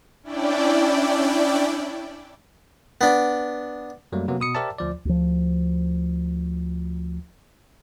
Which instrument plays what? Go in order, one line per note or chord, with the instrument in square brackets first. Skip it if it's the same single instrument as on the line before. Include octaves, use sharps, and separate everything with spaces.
[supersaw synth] C#4 D4 E4 D5 G5
[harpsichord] B3 D4
[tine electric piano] F#2 F#3 G3 A3 A#3
C3 F#3 A#3 B3
B2 D#6 C#7
G4 A#4 C5 D5 E5 A5
D2 F3 D5
[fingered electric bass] D2 F3